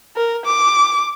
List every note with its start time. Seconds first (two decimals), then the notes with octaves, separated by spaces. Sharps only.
0.16 A#4
0.45 D6